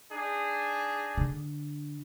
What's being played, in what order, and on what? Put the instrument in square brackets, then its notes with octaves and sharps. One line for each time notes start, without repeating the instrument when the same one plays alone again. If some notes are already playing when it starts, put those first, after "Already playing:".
[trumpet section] D4 D#4 G#4
[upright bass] D3